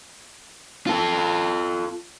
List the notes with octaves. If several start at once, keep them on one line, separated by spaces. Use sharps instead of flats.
F4 A4